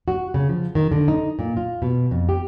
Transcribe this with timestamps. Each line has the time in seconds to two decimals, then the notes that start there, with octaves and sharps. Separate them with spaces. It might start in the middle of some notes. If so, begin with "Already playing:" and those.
0.08 F#4
0.34 C#3
0.49 F3
0.75 D#3
0.91 D3
1.08 D#4
1.39 A#2
1.57 F4
1.82 B2
2.11 F2
2.29 G4